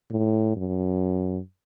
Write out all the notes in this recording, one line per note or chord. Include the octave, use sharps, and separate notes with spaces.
A2
F#2